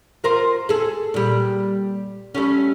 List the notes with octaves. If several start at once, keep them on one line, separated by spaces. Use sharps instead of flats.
F4 A#4 C5
G#4 A4
A#2 G3
G3 A3 C#4